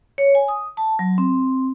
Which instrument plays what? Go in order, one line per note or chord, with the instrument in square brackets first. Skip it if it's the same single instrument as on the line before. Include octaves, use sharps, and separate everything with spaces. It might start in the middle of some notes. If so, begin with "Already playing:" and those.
[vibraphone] C#5
G#5
D#6
A5
F#3
C4